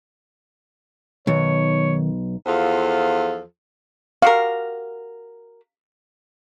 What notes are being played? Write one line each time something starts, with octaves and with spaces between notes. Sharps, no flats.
B1 D#3 C#5
E2 F3 F4 A4 C5
F#4 G4 A#4 F5